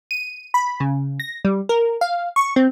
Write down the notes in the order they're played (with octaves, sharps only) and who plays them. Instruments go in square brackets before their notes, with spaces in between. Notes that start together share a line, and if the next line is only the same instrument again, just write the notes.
[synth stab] D#7
B5
C#3
A#6
G3
A#4
F5
C#6
C4